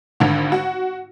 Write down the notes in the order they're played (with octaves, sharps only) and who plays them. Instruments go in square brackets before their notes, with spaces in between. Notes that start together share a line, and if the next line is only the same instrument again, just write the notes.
[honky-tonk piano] G#1 D3
F#4